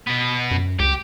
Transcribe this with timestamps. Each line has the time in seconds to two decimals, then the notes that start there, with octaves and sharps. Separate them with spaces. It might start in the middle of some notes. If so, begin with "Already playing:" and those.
0.07 B2 B3
0.51 F#2
0.79 C#2 G4